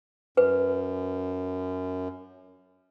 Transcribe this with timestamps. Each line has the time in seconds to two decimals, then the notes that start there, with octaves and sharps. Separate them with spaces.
0.37 F#2 B4